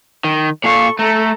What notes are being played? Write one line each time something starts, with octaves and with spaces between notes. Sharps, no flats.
D#3
A#2 A4 F5 C#6
A3 A4 A#5